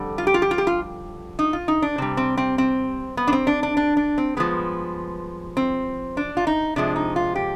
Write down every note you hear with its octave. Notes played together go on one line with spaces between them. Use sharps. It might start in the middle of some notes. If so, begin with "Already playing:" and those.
Already playing: F2 D3 G3
F4
G4
F4
G4
F4
G4
F4
D#4
F4
D#4
D4
C3 G3 C4
C4
C4
C4
B3
D4
C4
D4
D4
D4
D4
C4
G2 F3 G#3 B3
C4
D4
F4
D#4
C3 F3 G#3 D4
D#4
F4
G4